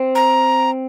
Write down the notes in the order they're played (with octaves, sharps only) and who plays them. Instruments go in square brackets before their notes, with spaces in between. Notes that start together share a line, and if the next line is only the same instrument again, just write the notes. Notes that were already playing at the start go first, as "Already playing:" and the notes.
Already playing: [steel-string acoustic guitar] C4
[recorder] A#5